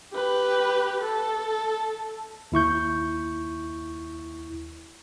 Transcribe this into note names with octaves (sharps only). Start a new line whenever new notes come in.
G4 B4
A4
D#2 E4 C#6 G6